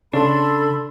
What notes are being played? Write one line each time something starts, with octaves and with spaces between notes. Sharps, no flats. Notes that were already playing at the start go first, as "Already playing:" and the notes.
C#3 D4 A4 B5 C6